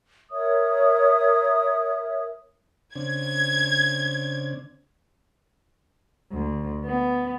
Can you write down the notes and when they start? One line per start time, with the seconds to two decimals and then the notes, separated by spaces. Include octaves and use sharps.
0.31 A#4 C#5 E5 D#6
2.96 C#3 C4 D4 G#6
6.32 D2
6.84 B3